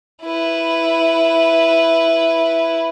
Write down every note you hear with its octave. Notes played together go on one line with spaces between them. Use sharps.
E4 B4